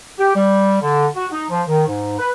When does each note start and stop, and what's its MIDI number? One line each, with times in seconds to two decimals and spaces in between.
0.19 0.35 67
0.35 0.77 55
0.81 1.06 50
1.15 1.26 66
1.32 1.44 63
1.49 1.62 53
1.67 1.84 51
1.87 2.16 44
2.19 2.32 71